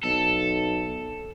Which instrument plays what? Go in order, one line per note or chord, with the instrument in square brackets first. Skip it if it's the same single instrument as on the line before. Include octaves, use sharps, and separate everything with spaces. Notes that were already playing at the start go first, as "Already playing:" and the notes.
[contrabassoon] B1 [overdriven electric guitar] A4